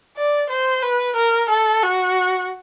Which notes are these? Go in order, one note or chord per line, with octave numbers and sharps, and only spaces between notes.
D5
C5
B4
A#4
A4
F#4